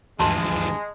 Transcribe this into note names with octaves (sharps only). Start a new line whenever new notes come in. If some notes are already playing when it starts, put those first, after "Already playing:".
D2 G2 E3 F3 G#3 A5 C6